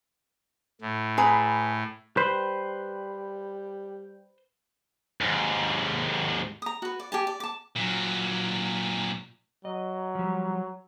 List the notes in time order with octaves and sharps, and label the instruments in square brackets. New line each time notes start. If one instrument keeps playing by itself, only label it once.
[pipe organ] A2
[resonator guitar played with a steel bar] G#4 B4 A#5 [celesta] G#5
[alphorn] G3 [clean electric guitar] B4 C5 [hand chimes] G6
[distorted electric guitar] D#2 G#2
[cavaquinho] A#5 D#6
F#4 B4
D5
G4 G#5 A5
D5
A5 D6
[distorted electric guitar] A#2 F#3
[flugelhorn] F#3 [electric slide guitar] D#5
[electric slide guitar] F3 G3